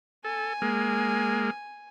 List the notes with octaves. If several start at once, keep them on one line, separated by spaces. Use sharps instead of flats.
A4 G#5
G#3 A#3